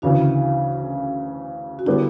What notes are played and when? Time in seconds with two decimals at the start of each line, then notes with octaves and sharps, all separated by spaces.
0.02 D2 C#3 E3 D4 F#4
1.79 F#4
1.86 D3 G3 B3 E4 G4